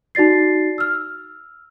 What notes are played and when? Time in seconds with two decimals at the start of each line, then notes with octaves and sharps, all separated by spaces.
0.15 D#4 F#4 D5 A6 C7
0.78 E6 F6